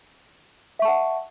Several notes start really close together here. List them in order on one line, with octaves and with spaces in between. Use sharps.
E5 C#6 A5 F#5